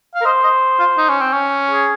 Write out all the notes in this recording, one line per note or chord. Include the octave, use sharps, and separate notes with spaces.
F5
A#4
C5 D#5
D#5
F4
D#4
C#4
C4
C#4
G#4